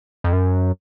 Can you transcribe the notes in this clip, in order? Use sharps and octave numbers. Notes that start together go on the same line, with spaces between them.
F2
F#2